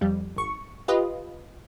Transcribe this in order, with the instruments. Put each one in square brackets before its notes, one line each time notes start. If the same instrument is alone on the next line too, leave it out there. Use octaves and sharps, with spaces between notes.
[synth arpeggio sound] F2 G3
G#1 C#6
F4 G4 B4 D#5